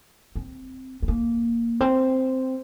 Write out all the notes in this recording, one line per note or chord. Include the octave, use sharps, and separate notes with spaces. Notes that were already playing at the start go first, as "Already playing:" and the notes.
C4
C4
A#3
C4